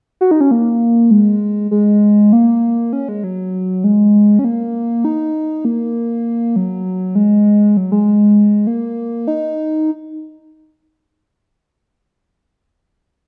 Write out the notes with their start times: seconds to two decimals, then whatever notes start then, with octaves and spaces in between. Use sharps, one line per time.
0.21 F#4
0.31 D#4
0.41 C#4
0.51 A#3
1.11 G#3
1.71 G#3
2.33 A#3
2.93 C#4
3.09 G#3
3.24 F#3
3.84 G#3
4.39 C#4
4.45 A#3
5.05 D#4
5.65 A#3
6.56 F#3
7.15 G#3
7.77 F#3
7.92 G#3
8.67 A#3
9.28 D#4